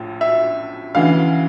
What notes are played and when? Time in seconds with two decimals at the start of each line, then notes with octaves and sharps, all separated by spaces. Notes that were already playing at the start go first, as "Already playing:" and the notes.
Already playing: A#1 A2 F3
0.21 E5
0.94 D2 C#3 E3 F5